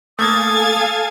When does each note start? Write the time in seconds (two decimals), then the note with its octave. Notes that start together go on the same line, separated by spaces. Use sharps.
0.19 A3 A#3 A4 F5 G#5 D#6 G#6 A6